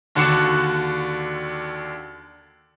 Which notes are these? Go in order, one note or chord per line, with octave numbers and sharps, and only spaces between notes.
D#2 D3 F#4 D5 C#7 E7